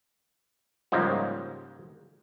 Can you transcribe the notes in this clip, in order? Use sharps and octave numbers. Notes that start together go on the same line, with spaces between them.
G#2 C#3 F3 G3 G#3 A#3